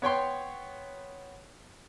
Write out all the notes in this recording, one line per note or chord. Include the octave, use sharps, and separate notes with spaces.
B3 C#5 G5 C6